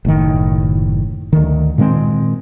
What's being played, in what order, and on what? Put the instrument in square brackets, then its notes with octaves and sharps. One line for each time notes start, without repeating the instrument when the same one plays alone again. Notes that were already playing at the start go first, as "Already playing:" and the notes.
[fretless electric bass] F#1 A2 D#3
D2 D#3
A#2 D#3 G#3 C4